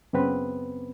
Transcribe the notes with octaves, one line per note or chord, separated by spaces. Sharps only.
F#2 C#3 B3 C4 B4